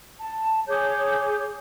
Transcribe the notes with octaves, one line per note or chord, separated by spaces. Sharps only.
A5
G#4 C#5 D6 G6